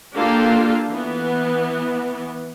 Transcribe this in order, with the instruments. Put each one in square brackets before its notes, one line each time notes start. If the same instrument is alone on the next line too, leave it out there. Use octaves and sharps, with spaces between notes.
[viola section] A#3 D4 F4 G4 A4
E3 B3